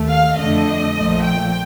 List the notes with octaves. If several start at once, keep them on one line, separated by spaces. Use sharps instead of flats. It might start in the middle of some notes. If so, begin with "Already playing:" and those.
Already playing: D#2 A3
F5
F2 D3 A3 D#5
A#1 A#2 F3 A3
G5